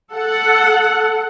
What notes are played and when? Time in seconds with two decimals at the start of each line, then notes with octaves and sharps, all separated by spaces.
0.14 A4 F#5